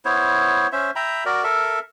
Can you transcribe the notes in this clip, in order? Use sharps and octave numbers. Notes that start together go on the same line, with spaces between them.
B3 E4 C5 C#5
C#4 C5 E5
E5 G5 A#5 B5
F#4 A#4 D5
A4 A#4 E5